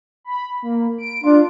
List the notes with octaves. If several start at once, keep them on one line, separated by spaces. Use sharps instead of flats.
B5
A#3
D7
D4 F4